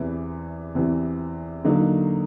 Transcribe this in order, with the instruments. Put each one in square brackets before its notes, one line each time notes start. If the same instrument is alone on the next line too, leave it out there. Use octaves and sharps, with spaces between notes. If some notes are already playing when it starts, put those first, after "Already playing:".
Already playing: [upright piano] E2 C3 E3
E2 C3 E3
D3 F#3 A#3 D#4